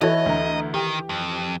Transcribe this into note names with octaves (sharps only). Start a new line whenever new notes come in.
E3 F#4 A4 C#5 D#5
D2 A#5
D#3 G4
F2